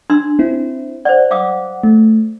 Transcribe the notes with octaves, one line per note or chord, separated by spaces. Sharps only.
D4 C6 E6
C4 E4
C5 D5 F#5
F5 D6 D#6
A3